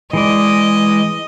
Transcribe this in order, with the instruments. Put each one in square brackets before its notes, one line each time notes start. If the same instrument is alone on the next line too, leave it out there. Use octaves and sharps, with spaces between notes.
[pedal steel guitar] E3 G#3 D5 [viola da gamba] D#5